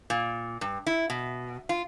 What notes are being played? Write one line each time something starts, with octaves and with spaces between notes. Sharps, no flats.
A#2
G2
E4
B2
F4